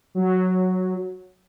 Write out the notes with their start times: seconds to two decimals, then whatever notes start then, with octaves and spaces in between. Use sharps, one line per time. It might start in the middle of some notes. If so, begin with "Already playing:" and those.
0.15 F#3